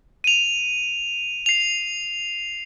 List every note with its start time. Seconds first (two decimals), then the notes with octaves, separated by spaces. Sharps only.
0.24 D#7 F7
1.46 C7 F7